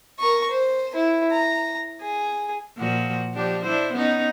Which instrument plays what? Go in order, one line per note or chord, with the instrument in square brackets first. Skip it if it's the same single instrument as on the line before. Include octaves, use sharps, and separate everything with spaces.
[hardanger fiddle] A#4 C#6
C5
E4
A#5
G#4
[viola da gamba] A#2 F3 F#4
F3 D4 G4
D4 E4 C5
B3 C#4 D#4